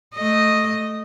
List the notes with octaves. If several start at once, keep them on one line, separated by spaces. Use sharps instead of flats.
A3 D#5